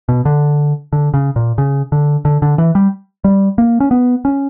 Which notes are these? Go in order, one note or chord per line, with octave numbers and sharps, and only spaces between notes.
B2
D3
D3
C#3
A#2
C#3
D3
D3
D3
E3
G3
G3
A#3
C#4
B3
C#4